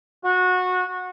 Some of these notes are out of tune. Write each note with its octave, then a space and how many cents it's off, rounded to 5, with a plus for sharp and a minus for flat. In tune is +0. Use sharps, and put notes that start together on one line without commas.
F#4 -20